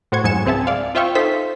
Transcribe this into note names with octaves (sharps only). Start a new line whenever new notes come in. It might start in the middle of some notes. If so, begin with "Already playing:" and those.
A2 F#4 C5 C#6 G#6
F2 G#2 F#3 G#5 C#7 E7
C#2 C4 G#4 E5 A5
D5 F5
F4 C5 E5 F5 G5 C#6
D#4 A4 C5 E5 B6